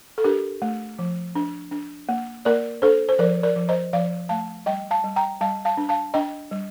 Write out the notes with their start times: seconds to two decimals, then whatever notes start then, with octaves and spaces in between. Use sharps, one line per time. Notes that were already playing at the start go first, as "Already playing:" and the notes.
0.18 A4
0.24 D4 G4 A#4
0.62 A3
0.99 F3
1.35 D4
1.71 D4
2.09 A#3
2.45 A#3 A#4 D5
2.82 D4 A4 C5
3.09 C5
3.19 F3 A#4 D5
3.43 A#4 D5
3.56 F3
3.69 C5 D#5
3.93 F3 D5 F5
4.29 A3 F5 A5
4.66 G3 D#5 G5
4.91 F5 A5
5.04 G3
5.16 G5 A#5
5.41 G3 F5 A5
5.65 F5 A5
5.77 D4
5.89 F5 A5
6.14 D4 D#5 G5
6.51 G3